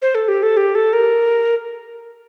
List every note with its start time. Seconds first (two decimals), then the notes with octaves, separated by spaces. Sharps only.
0.02 C5
0.15 A4
0.28 G4
0.43 A4
0.57 G4
0.75 A4
0.93 A#4